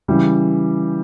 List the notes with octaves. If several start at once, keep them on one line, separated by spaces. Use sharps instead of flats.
C#3 E3 G3